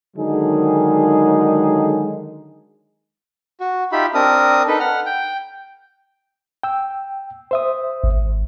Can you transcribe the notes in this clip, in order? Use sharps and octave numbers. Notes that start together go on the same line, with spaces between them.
D3 D#3 F#3 G#3 D#4 G#4
F#4
D#4 F4 G4 E5 B5
C4 D4 A#4 D#6
D#4 A4 B4
F#5 F6
G5
G5 E6
C5 E5 D#6
G#1